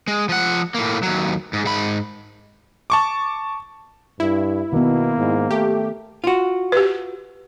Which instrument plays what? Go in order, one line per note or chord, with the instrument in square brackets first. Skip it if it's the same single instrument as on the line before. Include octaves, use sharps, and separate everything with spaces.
[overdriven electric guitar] G#3
F3 F#5
A2 A#3
D#2 F#3
G#2
G#2 B5
[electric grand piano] A5 C#6 D6
[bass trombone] G2 [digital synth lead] E4
[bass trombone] B2 [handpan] D#3 B3 [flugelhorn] A#3
[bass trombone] G#2
[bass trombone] A3 [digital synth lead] G4
[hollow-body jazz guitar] F4 F#4
[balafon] G4 B4